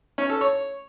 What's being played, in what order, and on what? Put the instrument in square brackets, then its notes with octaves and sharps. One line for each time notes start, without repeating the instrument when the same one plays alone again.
[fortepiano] C#4
A4
C#5